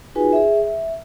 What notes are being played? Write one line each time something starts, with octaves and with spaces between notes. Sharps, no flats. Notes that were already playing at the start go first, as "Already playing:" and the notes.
D#4 F4 F#4 G#4 B4 G#5
G#4 E5
E5